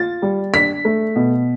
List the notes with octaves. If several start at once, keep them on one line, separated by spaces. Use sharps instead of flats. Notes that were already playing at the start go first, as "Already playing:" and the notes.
Already playing: F4 A6
G3
D4 B6
A3
B2